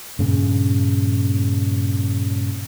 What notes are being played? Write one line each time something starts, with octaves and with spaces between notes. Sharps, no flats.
G2 A#2 C#3